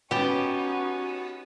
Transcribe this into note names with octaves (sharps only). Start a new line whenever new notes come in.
B3 C#4 D#4 F#4 G4 A5